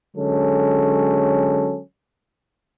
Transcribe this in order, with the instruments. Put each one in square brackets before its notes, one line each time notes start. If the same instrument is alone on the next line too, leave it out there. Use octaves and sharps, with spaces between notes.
[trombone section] D3 F#3 G#3 C#4 A4